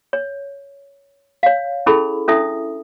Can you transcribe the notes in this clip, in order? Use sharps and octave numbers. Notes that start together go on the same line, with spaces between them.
C#5
C#5 F5
C#4 E4 G#4 A4 B5
C#4 D4 E4 A4 E5 D#6